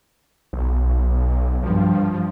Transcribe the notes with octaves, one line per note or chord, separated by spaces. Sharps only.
B1
G2 F3